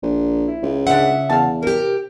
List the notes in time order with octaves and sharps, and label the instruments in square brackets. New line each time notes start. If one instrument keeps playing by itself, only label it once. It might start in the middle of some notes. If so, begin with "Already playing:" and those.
[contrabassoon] A#1
[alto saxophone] E4
[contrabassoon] C#2
[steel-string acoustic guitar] C#3 F#5 [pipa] D4 C5 [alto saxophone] E5
[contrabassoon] E2 [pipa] F5 A5
[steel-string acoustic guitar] C3 G4 [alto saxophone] A#4